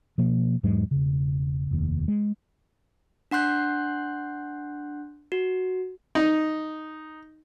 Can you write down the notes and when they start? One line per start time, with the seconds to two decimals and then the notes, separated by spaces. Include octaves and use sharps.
0.18 B2 F3 A#3
0.63 E2 G#2 F#3 G#3
0.91 E1 C#3
1.71 F1 D#2
2.08 G#3
3.31 D4 F#5 C6 F#6 G6
5.32 F#4
6.15 D#4